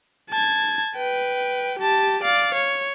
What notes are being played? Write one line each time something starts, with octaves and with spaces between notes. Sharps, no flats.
A5 G#6
B4 G5
G4 A5
D5 F5
C#5